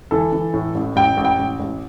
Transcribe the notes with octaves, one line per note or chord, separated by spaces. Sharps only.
E3 A4
E3
A2
A1
A1 G5
A1
G5
A1
A1